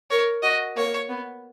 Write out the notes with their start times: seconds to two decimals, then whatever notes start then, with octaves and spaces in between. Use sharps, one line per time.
0.10 A#4 C#5
0.43 F#4 D#5
0.76 A#3 C#5
1.09 B3